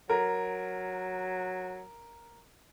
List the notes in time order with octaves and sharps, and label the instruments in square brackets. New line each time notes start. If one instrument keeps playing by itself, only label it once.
[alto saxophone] F#3 [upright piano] A#4